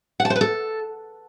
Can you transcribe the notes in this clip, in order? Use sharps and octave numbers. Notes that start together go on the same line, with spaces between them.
F#5
A5
C5
B4
A4